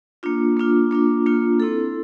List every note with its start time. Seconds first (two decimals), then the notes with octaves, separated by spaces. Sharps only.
0.23 A#3 D4 F4
0.57 A#3 D4 F4
0.91 A#3 D4 F4
1.26 A#3 D4 F4
1.60 C4 E4 A4